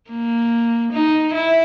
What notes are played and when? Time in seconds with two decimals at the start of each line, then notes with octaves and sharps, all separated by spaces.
0.10 A#3
0.92 D#4
1.34 E4